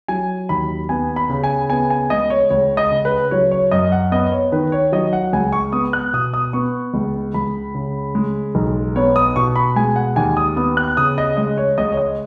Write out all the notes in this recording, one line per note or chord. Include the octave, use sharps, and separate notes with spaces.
F#3 G#5
D#2 B5
B3 G#5
B5
C#3
G#5
B3 G#5
G#5
C#2 D#5
C#5
C#2 C#5
D#5
C#3
B4
F#3 C#5
C#5
F#2 D#5
F#5
B3 D#5
C#5
D#3 B4
C#5
F#3 D#5
F#5
C#2 G#5
C#6
B3 D#6
F#6
B2 D#6
D#6
B3 C#6
C#2
C#2 B5
C#3
G#3
B1
B3 C#5
D#6
B2 C#6
B5
G#3 G#5
F#5
D#2 G#5
D#6
B3 D#6
F#6
C#3 D#6
D#5
G#3 D#5
C#5
C#2 D#5
C#5
D#5